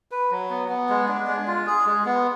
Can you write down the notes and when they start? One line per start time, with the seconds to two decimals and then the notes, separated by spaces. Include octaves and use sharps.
0.11 B4
0.31 F#3
0.50 B3
0.69 B3
0.89 G#3
1.08 D4
1.27 G#3
1.47 F4
1.67 G#4
1.86 G#3
2.05 B3